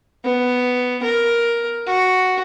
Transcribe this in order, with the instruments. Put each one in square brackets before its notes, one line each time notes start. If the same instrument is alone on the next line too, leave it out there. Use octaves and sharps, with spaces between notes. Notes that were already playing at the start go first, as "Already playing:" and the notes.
[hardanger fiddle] B3
A#4
F#4